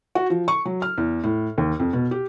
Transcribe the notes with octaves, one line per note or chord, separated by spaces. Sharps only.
F#4
F3
C#6
F#3
F6
E2
A2
D#2
F2
B2
G4